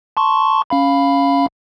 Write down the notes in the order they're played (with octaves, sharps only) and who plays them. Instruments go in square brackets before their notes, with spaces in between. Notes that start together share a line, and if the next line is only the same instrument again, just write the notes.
[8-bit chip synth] A5 C6 C#6
C#4 F5 B5